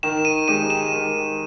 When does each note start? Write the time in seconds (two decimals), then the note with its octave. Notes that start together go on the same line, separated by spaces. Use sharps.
0.03 D#3 E7
0.25 D#7
0.48 G#3 D#4 G4 D#7
0.70 E7
0.93 D#3